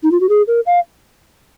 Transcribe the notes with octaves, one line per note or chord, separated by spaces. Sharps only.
D#4
F4
F#4
G#4
A#4
F5